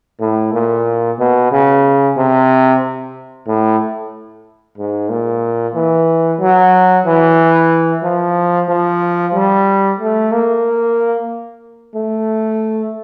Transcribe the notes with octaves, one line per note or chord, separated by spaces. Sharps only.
A2
A#2
B2
C#3
C3
A2
G#2
A#2
E3
F#3
E3
F3
F3
G3
A3
A#3
A3